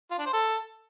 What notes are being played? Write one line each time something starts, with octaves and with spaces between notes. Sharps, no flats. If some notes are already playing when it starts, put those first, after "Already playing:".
F4
D4
C5
A4